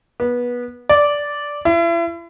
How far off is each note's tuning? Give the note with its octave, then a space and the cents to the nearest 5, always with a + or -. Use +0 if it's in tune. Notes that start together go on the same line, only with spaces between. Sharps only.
B3 -20
D5 -10
E4 +40